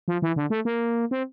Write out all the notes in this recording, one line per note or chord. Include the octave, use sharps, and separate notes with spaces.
F3
E3
D3
A3
A#3
C4